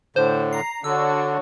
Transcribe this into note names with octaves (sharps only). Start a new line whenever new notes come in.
A2 D3 C5
A#5 C7
D3 D4 F#4 C#5 E6